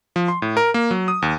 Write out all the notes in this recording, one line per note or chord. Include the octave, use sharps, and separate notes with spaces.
F3
C6
A2
A#4
A#3
F#3
D#6
D#2